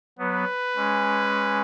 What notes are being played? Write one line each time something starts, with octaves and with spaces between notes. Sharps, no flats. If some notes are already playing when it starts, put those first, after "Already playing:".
F#3 B3 B4
G#3 C#4